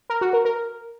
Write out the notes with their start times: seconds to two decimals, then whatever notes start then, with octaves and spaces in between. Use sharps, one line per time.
0.10 A#4
0.21 F#4
0.33 A#4
0.45 A#4